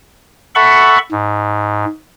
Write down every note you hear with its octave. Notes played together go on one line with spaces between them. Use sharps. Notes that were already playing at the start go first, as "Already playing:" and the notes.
A4 E5 F#5 B5 C#6
G#2